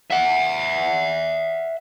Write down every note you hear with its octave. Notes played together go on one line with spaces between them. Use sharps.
E5 F#5